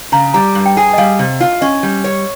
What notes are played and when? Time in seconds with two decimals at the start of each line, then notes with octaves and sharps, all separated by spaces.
0.12 C#3 A#5
0.34 G3 A#5
0.55 G2
0.66 G5
0.77 G#4
0.94 D#5
0.98 G3 F5
1.19 C3
1.40 F4
1.61 C#4 D#5
1.83 G3
2.04 C#5